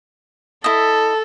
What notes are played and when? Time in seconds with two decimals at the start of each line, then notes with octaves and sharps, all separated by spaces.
0.64 E4 A4 D#5